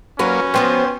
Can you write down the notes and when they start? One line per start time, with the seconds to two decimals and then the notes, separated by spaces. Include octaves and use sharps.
0.19 F#3 A#3 C#4 F#4 B4
0.54 F3 B3 F#4 B4 C5 G5 C6